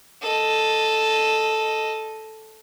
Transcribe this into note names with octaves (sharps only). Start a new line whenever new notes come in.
A4 D#5